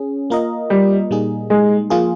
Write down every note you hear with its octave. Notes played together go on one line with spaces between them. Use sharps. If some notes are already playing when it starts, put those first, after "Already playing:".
Already playing: C#4 G#4
A#3 F4 A#4 D#5
G3
A#2 G3 A#3 D#4 G#4
G#3
F3 A#3 F4 G#4